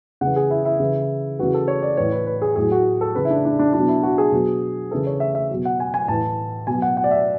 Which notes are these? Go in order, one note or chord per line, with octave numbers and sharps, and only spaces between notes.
C#3 E3 F#5
G#4
E4
E4
C#3 E3
C#3 E3 F#4
A4
C#5
D5
A2 E3 C#5
B4
B4
G#4
A2 F#3 G#4
F#4
A4
C#3 E3 B4
E4
D4
D4
D4
F#3 D4
B2
E4
F#4
G#4
B2 F#3
C#3 E3 A4
C#5
E5
E5
B2 F#3
F#5
G#5
G#5
A2 E3 A5
B2 F#3 G#5
F#5
F#5
D5
E5